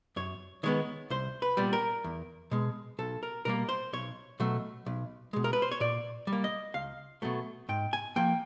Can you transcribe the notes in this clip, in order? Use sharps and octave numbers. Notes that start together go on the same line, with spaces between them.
F#2 C#5
D#3 G#3 B3 C#5
C2 C5
B4
A#2 G3 B3
A#4
E2
B2 G#3
B1 A4
A#4
B2 G3 A#3 A#4
C5
B1 C#5
B2 F#3 A3
B1
B2 G#3
A#4
B4
C5
C#5
A#2 D5
G3
A#3
D#5
C#2 F5
B2 F#3 A3
G#2 G5
G#5
F3 A#3 G5